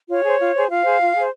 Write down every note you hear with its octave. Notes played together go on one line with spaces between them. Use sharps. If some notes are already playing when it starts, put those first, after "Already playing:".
F4 C#5
G#4 C5
F4
G#4 C5
F4 F5
G#4 C5
F4
G#4 C5